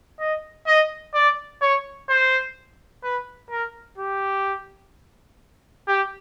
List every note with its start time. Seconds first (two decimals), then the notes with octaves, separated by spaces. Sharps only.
0.19 D#5
0.67 D#5
1.14 D5
1.61 C#5
2.09 C5
3.03 B4
3.50 A#4
3.98 G4
5.88 G4